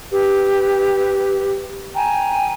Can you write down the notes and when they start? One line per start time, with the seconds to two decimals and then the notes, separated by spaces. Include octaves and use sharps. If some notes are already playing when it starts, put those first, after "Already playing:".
0.11 G4 B4
1.94 G5 G#5 A#5